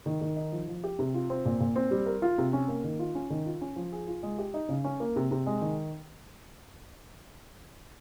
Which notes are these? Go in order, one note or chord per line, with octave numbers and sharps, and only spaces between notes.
D#3
D#3
D#4
F3
F3
G4
C3
F4
C4
A#2
A#2
C4
G3
A#4
F4
C3
C#4
A#3
D#3
F4
C#4
D#3
F4
C#4
F3
G#4
F4
G#3
G4
D#4
C#3
C#4
A#3
C3
C3
G#3
D#3